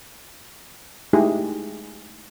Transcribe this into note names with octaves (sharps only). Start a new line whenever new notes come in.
G#3 A3 D#4 E4 G4 G#4